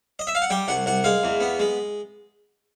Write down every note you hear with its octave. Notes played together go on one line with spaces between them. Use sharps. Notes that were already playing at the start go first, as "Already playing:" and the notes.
D#5
E5
F5
F#5
G3 G5
C2 F#5
C2 F#5
G#3 F5
E2
B3
G#3